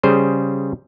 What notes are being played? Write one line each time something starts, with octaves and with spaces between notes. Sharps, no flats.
C#3 G3 G#4 C5